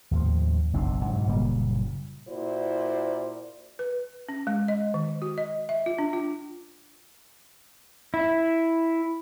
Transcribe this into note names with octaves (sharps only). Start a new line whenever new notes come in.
D#2 A2 F3
F#1 B1 C4 D4
G#2 B2 F#3
F#1 A#2 G3 A#3
A#2 E4 F#4 C5 D5
B4
C#4
G#3
D#5
D#3
F#4
D#5
E5
F4
D4
F4
E4